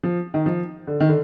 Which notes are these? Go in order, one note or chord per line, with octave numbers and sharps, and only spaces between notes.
F3
D#3
F3
D3
D#3
D3